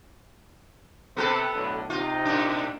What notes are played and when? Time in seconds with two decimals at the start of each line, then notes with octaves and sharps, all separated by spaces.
1.17 C3 B3 A4 B4
1.55 B1 A2 D3
1.90 C3 D#4 F4
2.25 A2 D4